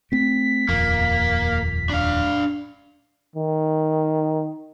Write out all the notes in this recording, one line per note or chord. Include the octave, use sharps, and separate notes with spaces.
A3 C4 B6
D#1 F2 A#3
D4 F5
D#3